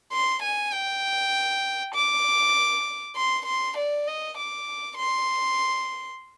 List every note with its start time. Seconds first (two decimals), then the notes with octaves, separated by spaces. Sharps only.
0.13 C6
0.42 G#5
0.73 G5
1.94 D6
3.16 C6
3.45 C6
3.77 D5
4.07 D#5
4.38 D6
4.97 C6